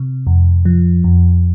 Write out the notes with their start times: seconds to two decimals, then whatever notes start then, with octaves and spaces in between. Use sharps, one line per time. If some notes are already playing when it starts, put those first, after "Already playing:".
Already playing: C3
0.27 F2
0.65 F3
1.04 F2